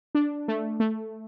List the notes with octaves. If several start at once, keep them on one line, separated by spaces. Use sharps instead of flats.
D4
A3
A3